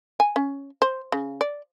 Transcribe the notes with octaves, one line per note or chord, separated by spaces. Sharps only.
G#5
C#4
C5
C#3
D5